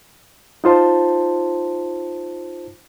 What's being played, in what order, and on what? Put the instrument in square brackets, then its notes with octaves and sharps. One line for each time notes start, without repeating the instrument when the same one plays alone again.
[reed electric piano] D#4 F4 C5 A5